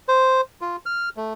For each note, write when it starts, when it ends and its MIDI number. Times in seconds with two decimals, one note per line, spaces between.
0.08 0.41 72
0.61 0.76 65
0.86 1.09 89
1.17 1.33 57